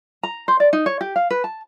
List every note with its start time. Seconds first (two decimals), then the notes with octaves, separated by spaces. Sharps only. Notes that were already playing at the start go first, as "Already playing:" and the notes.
0.23 A#5
0.48 C5
0.60 D5
0.73 D#4
0.86 C#5
1.01 G4
1.16 F5
1.30 B4
1.44 A5